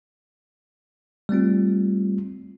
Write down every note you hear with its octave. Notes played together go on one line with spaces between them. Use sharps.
G3 A3 C4 F4